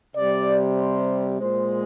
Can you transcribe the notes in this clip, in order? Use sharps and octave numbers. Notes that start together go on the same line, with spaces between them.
C3 G3 D5
C5
A#2 G#3 C5